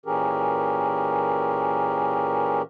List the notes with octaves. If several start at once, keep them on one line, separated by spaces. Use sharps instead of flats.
A#2 E3 C#4 G4 G#4 A#4